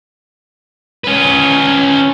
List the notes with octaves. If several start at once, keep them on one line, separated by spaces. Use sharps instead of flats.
C#4 B4